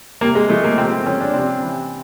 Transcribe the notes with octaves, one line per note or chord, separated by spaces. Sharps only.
C3 A#3
G#3
F3 A3
A#3
C3 C4
C4
F3 C#4
D4
C3 C4
E3